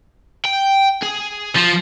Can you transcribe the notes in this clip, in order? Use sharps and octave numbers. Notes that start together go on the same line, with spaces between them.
G5
G#4
F3